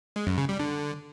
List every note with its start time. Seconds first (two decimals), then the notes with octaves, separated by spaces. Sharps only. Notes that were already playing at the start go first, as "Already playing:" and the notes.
0.16 G#3
0.27 F#2
0.38 C#3
0.49 G3
0.60 D3